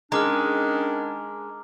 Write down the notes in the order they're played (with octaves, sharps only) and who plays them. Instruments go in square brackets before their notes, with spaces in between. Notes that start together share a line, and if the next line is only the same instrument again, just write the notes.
[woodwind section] D#3 C#4 D4 [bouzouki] G#3 [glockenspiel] A#5 D6 F6